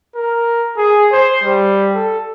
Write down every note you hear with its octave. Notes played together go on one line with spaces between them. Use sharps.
A#4
G#4
C5
G3
A4